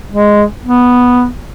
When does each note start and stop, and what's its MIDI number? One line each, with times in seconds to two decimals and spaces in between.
0.12 0.43 56
0.63 1.27 59